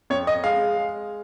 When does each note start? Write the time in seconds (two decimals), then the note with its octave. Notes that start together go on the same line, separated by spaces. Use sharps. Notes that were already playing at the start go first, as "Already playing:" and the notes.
0.10 F2 C#5
0.27 D#5
0.44 G#3 F5
0.77 G#3